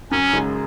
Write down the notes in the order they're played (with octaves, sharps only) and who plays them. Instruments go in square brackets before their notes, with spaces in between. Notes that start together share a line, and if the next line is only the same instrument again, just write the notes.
[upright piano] F#2 [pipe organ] C#4
[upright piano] C#3 G#3